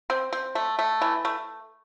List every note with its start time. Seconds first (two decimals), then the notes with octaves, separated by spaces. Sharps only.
0.10 C4
0.33 C4
0.55 A3
0.79 A3
1.01 E3
1.25 A3